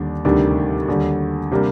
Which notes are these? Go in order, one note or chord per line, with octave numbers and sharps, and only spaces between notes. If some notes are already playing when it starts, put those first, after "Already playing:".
Already playing: D#2 D3 G3 D4
D2 C3 D#3 G3 D4
D#2 D3 G3
C3 G3 A#3 D4